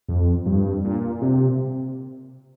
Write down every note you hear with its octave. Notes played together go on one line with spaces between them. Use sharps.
F2
G2
A#2
C3